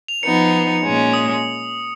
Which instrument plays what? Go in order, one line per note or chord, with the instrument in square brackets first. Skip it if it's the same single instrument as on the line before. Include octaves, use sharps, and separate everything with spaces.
[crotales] F7
[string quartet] F3 B3 D#4 [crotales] C#7
[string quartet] A#2 G#3 C#4
[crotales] D#6